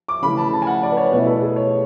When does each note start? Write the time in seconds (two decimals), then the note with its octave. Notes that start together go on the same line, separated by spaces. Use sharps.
0.08 D6
0.22 C#3 E3 A3 B5
0.37 A5
0.53 A5
0.62 G#5
0.67 F#5
0.83 D5
0.92 B4
0.97 C#5
1.12 B2 A3 E4 B4
1.26 A4
1.42 G#4
1.56 C#5